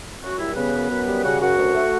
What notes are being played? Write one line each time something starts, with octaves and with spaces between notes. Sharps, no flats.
F#2 F#4
G3 E4
C#3 B3 B4
F#2
F#2
G3
C#3 F#4 F#5
F#2 F#4 F#5
D2
A3